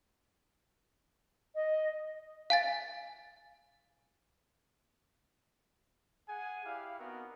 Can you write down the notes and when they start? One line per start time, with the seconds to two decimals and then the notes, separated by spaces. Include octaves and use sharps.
1.55 D#5
2.50 F5 G#5 A6
6.28 G#4 F#5 G#5
6.65 E4 G4 D5 F5
6.99 B3 C4 D#4 F#4 A#4